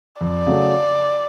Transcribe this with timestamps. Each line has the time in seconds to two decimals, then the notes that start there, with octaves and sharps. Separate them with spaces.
0.21 F2 D5
0.46 C#3 F#3 A3